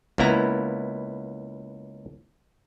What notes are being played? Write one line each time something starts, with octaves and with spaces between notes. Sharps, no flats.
C#2 A#3 B3 E4 A#5